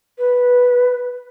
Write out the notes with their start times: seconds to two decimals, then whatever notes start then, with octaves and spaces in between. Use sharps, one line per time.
0.18 B4